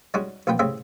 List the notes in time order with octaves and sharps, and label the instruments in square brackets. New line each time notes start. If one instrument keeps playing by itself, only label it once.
[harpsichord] G3 G#3 C#4 D#4 F#4
A1 A#2 F3 B3 G5
C2 A2 C#3 C4 E5